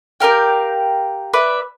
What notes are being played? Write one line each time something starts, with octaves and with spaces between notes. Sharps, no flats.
G4 A#4 F5 G5
B4 D5 E5